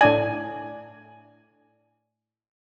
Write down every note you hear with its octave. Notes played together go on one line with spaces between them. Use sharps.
A2 D4 D5 G#5